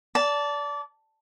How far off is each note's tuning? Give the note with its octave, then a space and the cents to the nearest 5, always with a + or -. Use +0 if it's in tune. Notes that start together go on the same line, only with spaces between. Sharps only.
D5 -25 A5 +0